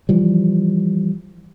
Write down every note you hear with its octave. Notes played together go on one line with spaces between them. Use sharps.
E3 F3 G3